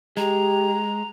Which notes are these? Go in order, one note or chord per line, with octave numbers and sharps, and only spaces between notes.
G#3 G4 A#5